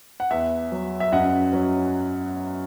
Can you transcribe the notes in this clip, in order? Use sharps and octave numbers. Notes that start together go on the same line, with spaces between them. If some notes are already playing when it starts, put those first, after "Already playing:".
F#5
E2 E5
F#3
E5
F#2 D#5 F#5
F#3